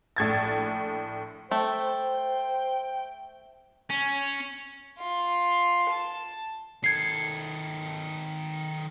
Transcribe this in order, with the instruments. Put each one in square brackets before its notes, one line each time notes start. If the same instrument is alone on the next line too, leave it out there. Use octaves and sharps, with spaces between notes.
[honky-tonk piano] A#1 A2 G#6 A6
[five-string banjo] A3 [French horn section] C5 [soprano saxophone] G5
[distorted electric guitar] C#4
[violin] F4
A5
[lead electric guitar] D#3 A4 [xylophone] G#6 C7